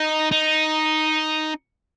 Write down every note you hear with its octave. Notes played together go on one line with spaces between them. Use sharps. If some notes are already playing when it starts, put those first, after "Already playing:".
Already playing: D#4
D#4